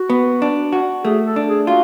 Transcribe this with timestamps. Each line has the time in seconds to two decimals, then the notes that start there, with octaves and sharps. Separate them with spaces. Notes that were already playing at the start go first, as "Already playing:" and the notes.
Already playing: F#4
0.10 B3
0.42 D4
0.73 F#4
1.04 A3 G#4
1.25 A4
1.36 D4
1.47 G#4
1.67 F4 F#4